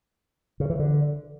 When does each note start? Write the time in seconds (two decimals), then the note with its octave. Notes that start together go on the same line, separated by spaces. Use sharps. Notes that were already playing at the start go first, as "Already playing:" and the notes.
0.60 C#3
0.70 E3
0.79 D3